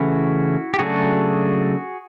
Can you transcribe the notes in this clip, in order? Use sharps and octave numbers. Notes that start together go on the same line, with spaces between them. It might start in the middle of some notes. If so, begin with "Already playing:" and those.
Already playing: C#3 E3 A3 C#4 E4 F#4
G4
C#3 F#3 A3 D4 F#4 G#4